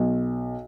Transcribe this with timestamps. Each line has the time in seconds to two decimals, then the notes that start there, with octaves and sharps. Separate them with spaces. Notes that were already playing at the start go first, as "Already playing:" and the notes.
Already playing: B1